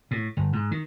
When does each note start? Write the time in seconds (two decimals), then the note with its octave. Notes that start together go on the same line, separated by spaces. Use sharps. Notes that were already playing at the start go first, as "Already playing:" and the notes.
0.11 A2
0.37 G1
0.53 G#2
0.71 D#3